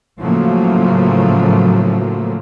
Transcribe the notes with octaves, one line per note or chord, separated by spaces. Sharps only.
A2 C#3 F3 F#3 A3 A#3